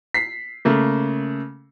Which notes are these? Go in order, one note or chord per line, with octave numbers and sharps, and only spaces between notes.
B6 C7
C#3 A3 A#3